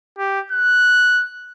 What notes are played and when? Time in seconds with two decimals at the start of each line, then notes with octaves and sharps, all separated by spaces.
0.19 G4
0.52 F#6